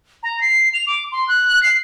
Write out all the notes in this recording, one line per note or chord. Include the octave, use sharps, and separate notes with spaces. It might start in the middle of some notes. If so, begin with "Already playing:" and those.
A#5
C7
F7
D6
C6
F#6
C7